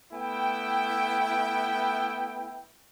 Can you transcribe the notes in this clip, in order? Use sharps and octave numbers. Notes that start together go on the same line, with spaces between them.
A3 B3 E4 G5